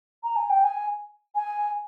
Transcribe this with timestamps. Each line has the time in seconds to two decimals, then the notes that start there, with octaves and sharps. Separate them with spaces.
0.24 A#5
0.36 G#5
0.50 G5
0.64 G#5
1.35 G#5